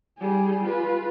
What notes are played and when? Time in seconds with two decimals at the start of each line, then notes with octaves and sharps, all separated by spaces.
0.18 G3 G#4
0.63 F4 B4